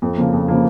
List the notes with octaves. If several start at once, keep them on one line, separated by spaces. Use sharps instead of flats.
F2
C#3 F3 A#3
F2
C#3 F3 A#3